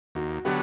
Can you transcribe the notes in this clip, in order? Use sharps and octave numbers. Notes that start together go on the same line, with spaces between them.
D#2 F#4
D3 F#3 B3 G4